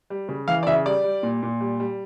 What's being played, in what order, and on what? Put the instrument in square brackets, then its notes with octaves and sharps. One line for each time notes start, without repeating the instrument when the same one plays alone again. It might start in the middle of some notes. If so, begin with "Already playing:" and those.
[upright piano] G3
C#3
E3 F5
D5
C#3 E5
G3 D5
G3
A#2
A#2
G3
G3